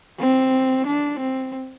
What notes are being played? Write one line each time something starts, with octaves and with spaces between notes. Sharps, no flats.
C4
D4
C4